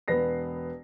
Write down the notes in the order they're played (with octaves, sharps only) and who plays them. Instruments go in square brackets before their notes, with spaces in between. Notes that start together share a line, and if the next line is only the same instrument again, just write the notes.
[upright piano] E1 B3 B4 A#6 C7